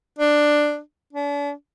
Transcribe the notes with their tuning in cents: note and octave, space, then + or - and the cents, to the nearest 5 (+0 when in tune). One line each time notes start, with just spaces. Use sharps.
D4 +10
D4 -40